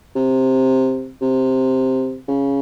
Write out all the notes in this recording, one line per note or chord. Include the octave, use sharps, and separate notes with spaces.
C3
C3
C#3